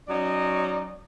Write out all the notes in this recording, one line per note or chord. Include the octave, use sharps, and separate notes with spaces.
F#3 C#4 D#4 D5 D#5